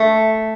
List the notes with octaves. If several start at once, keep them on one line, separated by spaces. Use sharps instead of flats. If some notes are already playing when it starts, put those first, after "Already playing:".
Already playing: A3